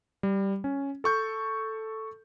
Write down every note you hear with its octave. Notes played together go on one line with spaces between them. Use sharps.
G3
C#4
A4 C#6 G6